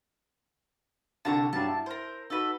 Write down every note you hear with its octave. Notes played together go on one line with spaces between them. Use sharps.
C2 D3 A5 A#5 C#6
G2 F#3 A5
E4
A#4 C5
D#4 F#4 A4 B4